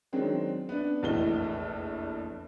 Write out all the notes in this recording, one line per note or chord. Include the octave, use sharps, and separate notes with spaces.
D#3 F#3 G#3 C4 D4
B3 D4
F1 A#1 E2 A2 D#5 G7